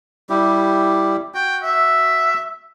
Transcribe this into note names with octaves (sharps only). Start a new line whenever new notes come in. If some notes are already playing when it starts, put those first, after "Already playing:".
G3 E4 G4
F#4 G5
E5